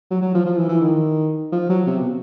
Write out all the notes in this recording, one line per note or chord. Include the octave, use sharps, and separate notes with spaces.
F#3
F#3
F3
F3
E3
E3
D#3
F3
F#3
C3
B2